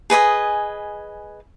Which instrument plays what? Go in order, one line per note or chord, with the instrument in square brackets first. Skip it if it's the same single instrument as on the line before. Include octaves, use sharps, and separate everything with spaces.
[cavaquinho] G#4 B4 D#5 G#5